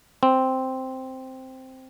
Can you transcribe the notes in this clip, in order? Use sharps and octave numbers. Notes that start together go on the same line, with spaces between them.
C4